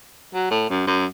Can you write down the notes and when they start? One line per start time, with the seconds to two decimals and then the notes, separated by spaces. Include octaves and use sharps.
0.34 F#3
0.51 A2
0.70 F#2
0.87 F#2